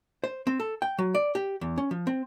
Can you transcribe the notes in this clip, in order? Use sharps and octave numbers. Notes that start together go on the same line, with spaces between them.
C5
C4
A4
G5
F#3
D5
G4
E2
C#4
F3
C4